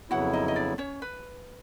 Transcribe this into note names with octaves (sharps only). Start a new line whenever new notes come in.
F2 C#3 F#3 B3 E4 F#4 F#5
D#4 D#5
D#5
D4 D5
C#4 C#5
B4